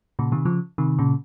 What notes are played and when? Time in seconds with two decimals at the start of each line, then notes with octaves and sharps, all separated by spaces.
0.19 A#2 C#3
0.32 C3 D#3
0.45 C#3 F3
0.78 C3 D#3
0.99 A#2 C#3